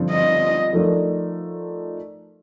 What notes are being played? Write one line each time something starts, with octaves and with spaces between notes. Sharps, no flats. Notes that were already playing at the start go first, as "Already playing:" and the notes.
Already playing: G2 D3 F3 C4
D#5
F3 A3 D#4 A#4 D5